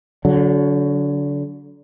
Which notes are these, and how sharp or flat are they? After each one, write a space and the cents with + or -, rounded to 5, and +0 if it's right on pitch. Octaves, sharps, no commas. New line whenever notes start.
D3 -30 F#3 +0